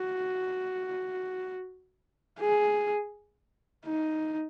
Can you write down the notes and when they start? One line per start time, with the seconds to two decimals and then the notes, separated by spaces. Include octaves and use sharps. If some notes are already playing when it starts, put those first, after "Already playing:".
Already playing: F#4
2.40 G#4
3.86 D#4